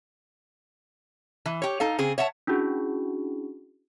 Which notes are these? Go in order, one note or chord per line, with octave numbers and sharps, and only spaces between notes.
E3
G4 C#5
D#4 A4 F5
C#3 C4 G#4
C#5 E5 F#5 A5
C#4 D4 E4 F#4 G#4